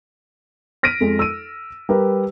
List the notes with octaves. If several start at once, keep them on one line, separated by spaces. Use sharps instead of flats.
F6 A#6 B6 D7 D#7
F2 G#3
E6 D#7
G3 G4 A#4 B4